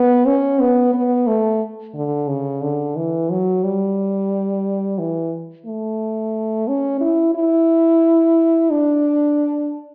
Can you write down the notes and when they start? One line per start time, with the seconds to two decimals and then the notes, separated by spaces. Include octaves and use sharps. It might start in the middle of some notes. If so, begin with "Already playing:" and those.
Already playing: B3
0.26 C#4
0.60 B3
0.93 B3
1.27 A3
1.94 D3
2.28 C#3
2.62 D3
2.96 E3
3.30 F#3
3.64 G3
4.99 E3
5.66 A3
6.68 C#4
7.01 E4
7.35 E4
8.71 D4